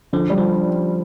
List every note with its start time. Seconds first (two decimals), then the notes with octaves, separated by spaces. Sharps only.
0.13 D3 F3
0.30 G3
0.38 F3